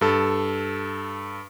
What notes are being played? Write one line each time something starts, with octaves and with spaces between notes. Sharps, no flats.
G2 A4